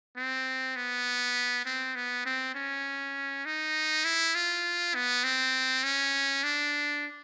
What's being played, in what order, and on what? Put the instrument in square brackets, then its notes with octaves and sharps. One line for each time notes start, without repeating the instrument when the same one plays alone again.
[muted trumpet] C4
B3
C4
B3
C4
C#4
D#4
E4
F4
B3
C4
C#4
D4